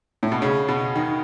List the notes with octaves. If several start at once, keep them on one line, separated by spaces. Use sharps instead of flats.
A2
B2
C#3
B2
D#3